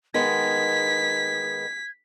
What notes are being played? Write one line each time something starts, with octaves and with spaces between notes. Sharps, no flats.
D#3 G#3 B3 G#6 B6